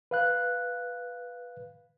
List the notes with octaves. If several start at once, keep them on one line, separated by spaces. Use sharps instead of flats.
B4 F5 F#6